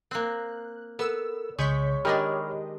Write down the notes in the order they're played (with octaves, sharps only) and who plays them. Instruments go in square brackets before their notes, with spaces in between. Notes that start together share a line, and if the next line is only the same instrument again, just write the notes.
[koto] A#3 C4 [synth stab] F#6
[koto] B3 [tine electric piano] A4 A#4 [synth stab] E6
[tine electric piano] C2 C#3 [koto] G#3 [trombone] C#5 [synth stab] C#6 G6 B6
[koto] D#3 G#3 D4 [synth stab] G4 D#5 [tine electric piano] B5 F6